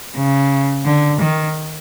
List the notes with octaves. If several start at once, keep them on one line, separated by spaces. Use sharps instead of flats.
C#3
D3
D#3